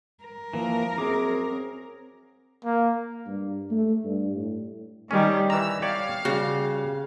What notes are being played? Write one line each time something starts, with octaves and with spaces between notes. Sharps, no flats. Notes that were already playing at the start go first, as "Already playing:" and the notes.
A#4
E3 F3 A#3
F#2 C4 G#4 D6
A#3
G2
A3
G2
A2
D#3 G3 C#4 G4
E3 A#5 E6
G4 C#5 D5 F5
C#3 G3 F#4